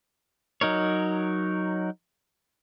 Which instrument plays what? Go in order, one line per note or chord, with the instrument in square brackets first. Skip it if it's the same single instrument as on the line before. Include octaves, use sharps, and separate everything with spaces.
[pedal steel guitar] F#3 D#4 A#4 C#5